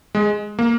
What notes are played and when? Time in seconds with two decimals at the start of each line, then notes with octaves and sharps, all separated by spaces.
0.15 G#3
0.59 A#3